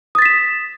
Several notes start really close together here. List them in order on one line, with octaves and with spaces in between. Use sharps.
D#6 A6 B6 E7